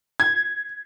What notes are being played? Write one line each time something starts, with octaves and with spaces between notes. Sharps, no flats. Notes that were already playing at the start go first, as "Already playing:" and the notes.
G#6